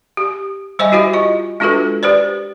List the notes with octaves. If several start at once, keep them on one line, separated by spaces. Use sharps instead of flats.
G4
G3 C5 D#5 E5 G#5
E4 F#4 G4 C5 E5
F4 D#5
G#3 D4 F4 F#4 A4 B4
G4 B4 C5 D5